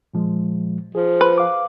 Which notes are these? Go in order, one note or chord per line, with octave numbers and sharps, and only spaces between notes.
A#2 F3 G#3
F3 G#4
B4
F5 D6